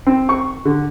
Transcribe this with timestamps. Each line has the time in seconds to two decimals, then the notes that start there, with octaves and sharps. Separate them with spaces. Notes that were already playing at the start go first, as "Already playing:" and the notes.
0.07 C4
0.29 C#6
0.65 D3